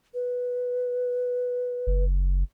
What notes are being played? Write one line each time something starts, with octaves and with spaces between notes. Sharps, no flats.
B4
F#1